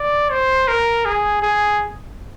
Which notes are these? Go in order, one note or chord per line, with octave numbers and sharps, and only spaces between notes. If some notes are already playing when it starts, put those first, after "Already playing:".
Already playing: D5
C5
A#4
G#4
G#4